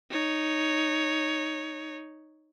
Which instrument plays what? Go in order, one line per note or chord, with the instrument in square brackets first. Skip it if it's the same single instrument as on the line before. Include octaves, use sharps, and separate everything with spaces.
[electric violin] D#4 C#5